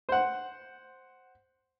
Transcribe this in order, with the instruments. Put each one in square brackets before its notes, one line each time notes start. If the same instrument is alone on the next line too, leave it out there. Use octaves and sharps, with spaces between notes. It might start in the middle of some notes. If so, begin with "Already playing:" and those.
[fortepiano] C5 F#5